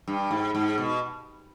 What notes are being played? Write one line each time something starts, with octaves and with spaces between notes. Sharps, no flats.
G2
G#2
G#2
B2